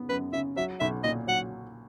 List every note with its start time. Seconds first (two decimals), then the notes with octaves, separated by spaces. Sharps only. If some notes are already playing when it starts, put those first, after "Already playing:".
Already playing: C#3 B3
0.09 F#2 B4
0.33 C#3 E5
0.56 F#3 E5
0.80 B1 E5
1.04 A#2 D#5
1.27 F#3 F#5